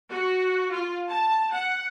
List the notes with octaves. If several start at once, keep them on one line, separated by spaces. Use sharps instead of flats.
F#4
F4
A5
F#5